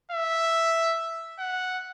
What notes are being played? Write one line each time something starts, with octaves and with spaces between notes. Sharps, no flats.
E5
F#5